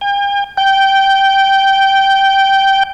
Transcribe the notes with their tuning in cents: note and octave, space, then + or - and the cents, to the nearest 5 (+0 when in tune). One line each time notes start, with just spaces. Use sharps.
G5 +45
G5 -10